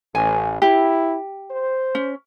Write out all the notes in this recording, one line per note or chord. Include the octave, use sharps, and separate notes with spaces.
A1 G#5
E4 G4
C5
C#4